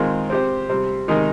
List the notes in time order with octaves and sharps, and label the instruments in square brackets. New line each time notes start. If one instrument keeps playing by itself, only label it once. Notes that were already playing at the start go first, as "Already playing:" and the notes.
Already playing: [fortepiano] D#3 G#3 C4 F4
C4 G4 C5
C3 G3 C4
C3 D#3 G#3 D#4 A#4